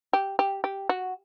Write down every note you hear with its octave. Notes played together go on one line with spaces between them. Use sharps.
G4
G4
G4
F#4